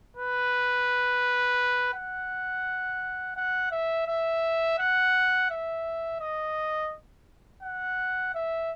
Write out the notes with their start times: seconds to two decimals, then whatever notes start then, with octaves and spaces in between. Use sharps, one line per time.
0.17 B4
1.93 F#5
3.36 F#5
3.71 E5
4.07 E5
4.78 F#5
5.50 E5
6.20 D#5
7.63 F#5
8.34 E5